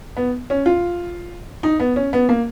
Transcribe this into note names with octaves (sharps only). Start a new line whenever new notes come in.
B3
C#4
F4
D#4
B3
C#4
B3
A#3